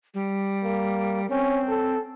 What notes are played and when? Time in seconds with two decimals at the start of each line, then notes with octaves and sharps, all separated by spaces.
0.14 G3
0.64 A#3
1.30 C4 C#4
1.69 A4